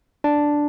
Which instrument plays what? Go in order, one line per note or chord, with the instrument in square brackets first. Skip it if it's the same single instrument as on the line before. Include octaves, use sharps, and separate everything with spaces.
[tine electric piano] D4